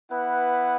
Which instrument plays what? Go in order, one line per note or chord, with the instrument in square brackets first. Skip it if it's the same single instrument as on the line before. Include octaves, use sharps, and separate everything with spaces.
[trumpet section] B3 E4 B4 F#5